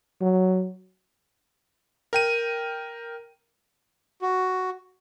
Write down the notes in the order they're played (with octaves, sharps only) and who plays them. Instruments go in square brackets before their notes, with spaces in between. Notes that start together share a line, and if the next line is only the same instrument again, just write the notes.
[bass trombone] F#3
[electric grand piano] A#4 G5 D#7
[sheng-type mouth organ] F#4